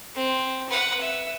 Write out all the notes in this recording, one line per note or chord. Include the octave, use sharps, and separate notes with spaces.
C4
B4 F#5
E5